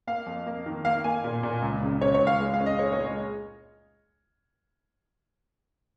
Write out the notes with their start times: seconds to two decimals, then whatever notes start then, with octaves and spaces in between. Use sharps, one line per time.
0.07 A#3 F5
0.26 F2
0.46 A#3
0.66 D#3
0.85 A#3 F5
1.04 A#3 G#5
1.24 A#2
1.43 A#2
1.62 C#2
1.82 C#3
2.01 C#3 C#5
2.15 C#5
2.21 C#2
2.27 F5
2.40 G#3
2.54 F5
2.60 C#4
2.66 D#5
2.79 G#3 C#5
2.92 C#5
2.99 G#3
3.06 D#5